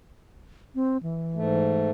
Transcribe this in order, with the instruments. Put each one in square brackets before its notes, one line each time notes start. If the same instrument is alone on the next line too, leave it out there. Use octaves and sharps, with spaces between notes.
[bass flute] C4
E3
[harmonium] G#2 A3